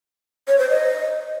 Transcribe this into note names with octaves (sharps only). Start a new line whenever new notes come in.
C#5
C5
D#5